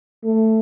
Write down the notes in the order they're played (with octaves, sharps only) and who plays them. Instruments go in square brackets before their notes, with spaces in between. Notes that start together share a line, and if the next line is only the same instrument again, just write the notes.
[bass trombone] A3